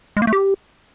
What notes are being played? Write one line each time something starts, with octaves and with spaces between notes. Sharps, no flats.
G#3
A#3
A3
G4